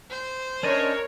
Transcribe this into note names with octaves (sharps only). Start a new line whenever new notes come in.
C5
C#4 D4 A#4 C#5 D#5